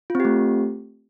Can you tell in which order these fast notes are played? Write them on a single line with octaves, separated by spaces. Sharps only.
F4 C4 G4 A3